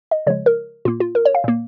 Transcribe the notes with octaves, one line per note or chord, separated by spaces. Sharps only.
D#5
C#3 F3 G#3 C#5
A#4
A#2 A#3 F4
F4
A#4
C#5
F5
A#2 A#3